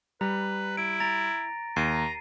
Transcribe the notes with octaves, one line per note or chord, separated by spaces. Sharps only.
G3 B4 A#5
E4 D7
A#5 A6 A#6
D#2 A#5 C7 D#7